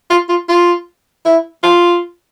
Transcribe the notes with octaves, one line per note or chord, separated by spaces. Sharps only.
F4
F4
F4
E4
F4